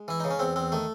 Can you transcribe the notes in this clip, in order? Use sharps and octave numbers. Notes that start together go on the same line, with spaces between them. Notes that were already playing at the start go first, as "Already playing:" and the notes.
Already playing: G#3
E3 E4
C#3 D#4
C#4
E2 C4
E2 C4
D#3 A3